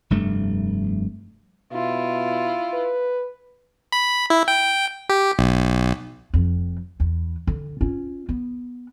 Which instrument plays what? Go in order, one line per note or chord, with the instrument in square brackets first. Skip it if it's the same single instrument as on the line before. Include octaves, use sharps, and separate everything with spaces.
[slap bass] F1 G2 A3
[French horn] B2 [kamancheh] E4 F4
[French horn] B4
[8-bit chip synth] B5
E4
G5
G4
B1
[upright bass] F1 F2
E2
D3
C#4 F4
B3